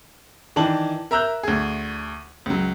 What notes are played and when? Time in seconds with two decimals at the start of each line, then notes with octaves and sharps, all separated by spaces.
0.56 D#3 E3 D4 A5 F#7
1.11 A#4 E5 A#5 E6 F#6 G6
1.43 D2 G#4
2.46 C#2 F#3